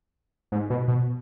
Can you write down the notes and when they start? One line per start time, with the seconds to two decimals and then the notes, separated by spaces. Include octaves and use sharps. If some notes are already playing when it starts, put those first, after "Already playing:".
0.52 G#2
0.70 B2
0.88 B2